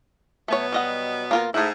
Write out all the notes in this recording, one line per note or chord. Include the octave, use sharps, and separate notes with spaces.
B2 F#3 A3 B3 C#5
G3 D#5 F#5
A#3 F4 A#4
G#2 A3 E4